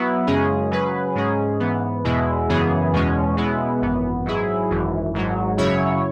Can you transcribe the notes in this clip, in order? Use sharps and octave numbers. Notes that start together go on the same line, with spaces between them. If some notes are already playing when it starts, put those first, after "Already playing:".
Already playing: F#3 B3 E4
F#2 C#3 G#3 C#4 G#4
C#3 F#3 C#4 G#4 B4
G#2 G#3 C#4 G#4
G#2 E3 B3
E2 B2 G#3 E4
F#2 C#3 E3 B3 G#4
E2 B2 G#3 C#4
B2 G#3 B3 E4
G#1 F#2 E3 B3
G#2 F#3 E4 G#4
G#1 F#2 E3
G#1 G#2 F#3
F#2 C#3 F#3 E4 C#5